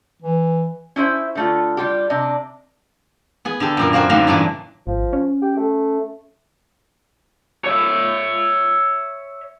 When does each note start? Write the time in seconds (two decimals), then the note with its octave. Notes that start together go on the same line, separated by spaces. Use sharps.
0.22 E3
0.96 C#4 E4 C5 E5
1.35 D3 A3 F4
1.77 G3 F4 G4
2.10 C3 D4 D#5
3.45 B3 G#4
3.60 D3 G4 A4
3.77 F#2 A#2 A#4
3.93 A#3 C4 F#4 A#4 B4
4.09 D3 A3 A#3 C4 D4 D#4
4.27 G2 A#2 E3 C#4 D4
4.87 G#1 F3
5.13 C#4
5.42 G4
5.57 A3
7.65 C#5 E5